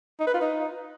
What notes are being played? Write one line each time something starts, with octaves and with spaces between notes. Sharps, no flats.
D#4
B4
F4
D#4